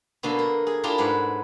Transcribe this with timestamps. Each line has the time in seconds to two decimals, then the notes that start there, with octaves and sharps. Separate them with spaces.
0.23 B2 D3 A#3 A4
0.39 A#4
0.67 G#4
0.83 D4 E4 F4 G4 A4 A#4
0.98 G#2 D4 B4 F#5